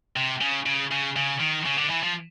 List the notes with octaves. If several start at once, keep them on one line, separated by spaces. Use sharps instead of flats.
C3
C#3
C#3
C#3
C#3
D#3
C#3
D3
E3
F3